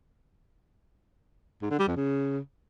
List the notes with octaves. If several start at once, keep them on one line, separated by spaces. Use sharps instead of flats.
G#2
D3
G3
F2
C#3